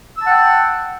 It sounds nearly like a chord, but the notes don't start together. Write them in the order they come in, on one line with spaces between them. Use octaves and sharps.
E6 A5 F#5 G5